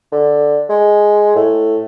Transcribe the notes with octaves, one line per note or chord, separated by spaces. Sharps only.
D3
G#3
A2